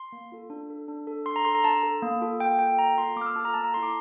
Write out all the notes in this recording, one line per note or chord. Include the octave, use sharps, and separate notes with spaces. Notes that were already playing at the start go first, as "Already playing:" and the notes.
Already playing: C6
A#3
F4 A4
D4
A4
D4
A4
D4 C6
A#5
A4 C6
A#5
D4 A5
A4
A#3
F4 A4
A#3 G5
F4 A4 G5
A#3 A#5
F4 A4 C6
A#3 D6
F6
E6
F4 A4 A5
A#5
A#3 A5
A#5
E4 A4 C6
D6